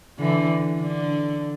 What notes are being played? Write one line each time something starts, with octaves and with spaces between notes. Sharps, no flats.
D3 E3
D3